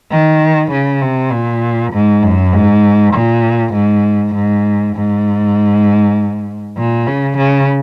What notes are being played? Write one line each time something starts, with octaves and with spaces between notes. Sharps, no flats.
D#3
C#3
C3
A#2
G#2
F#2
G#2
A#2
G#2
G#2
G#2
A#2
C#3
C#3